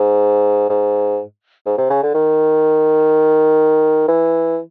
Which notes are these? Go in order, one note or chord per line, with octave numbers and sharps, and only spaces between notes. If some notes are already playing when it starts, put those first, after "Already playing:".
Already playing: G#2
G#2
G#2
C3
C#3
D3
D#3
E3